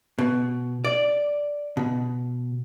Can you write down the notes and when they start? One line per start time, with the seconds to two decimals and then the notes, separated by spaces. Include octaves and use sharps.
0.18 B2
0.85 D5
1.77 B2